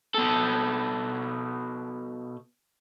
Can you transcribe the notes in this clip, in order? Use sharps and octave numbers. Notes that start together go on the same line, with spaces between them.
B2 A4